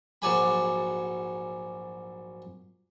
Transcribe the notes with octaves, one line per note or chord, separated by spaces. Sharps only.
A#1 G#2 F#3 D5 G#5 B5